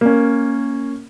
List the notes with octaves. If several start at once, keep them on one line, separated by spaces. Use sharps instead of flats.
A#3 C#4